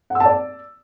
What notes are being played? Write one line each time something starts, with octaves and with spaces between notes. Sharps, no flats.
F#5
E6
A5
D5